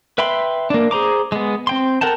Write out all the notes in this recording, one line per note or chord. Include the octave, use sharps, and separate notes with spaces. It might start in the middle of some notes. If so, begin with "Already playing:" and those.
B4 E5 G5 B5 C6
A#3 D4
G#4 C5 A#5 D6
G#3 B3
C4 G5 C6
A4 A#4 F#5 G5 A5